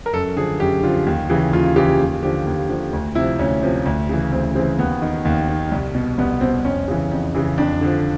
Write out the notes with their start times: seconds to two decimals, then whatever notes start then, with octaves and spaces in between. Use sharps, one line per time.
0.06 A#4
0.13 F#2 A4
0.36 D3 F3 G#4
0.60 F#2 G4
0.83 D3 F3 F4
1.06 D#2
1.30 C#3 E3
1.53 D#2 F4
1.76 C#3 E3 G4
1.99 D#2
2.23 D3 F3 G4
2.47 D#2
2.69 D3 F3
2.93 D2
3.15 C3 F3 E4
3.39 D2 C#4
3.63 C3 F3
3.85 D2
4.09 C#3 E3
4.32 D2 C4
4.55 C#3 C4
4.59 E3
4.79 D#2 B3
5.02 D#3
5.25 D#2
5.48 D#3
5.72 C2
5.95 B2
6.18 C2 B3
6.41 B2 C4
6.65 F2 C#4
6.88 C#3 E3
7.11 F2
7.35 C#3 E3
7.58 F2 D4
7.81 D3 F3